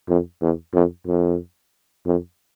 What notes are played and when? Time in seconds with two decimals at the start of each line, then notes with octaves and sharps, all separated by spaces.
0.08 F2
0.41 E2
0.74 F2
1.07 F2
2.06 F2